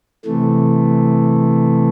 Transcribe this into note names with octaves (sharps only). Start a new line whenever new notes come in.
C3 E3 A3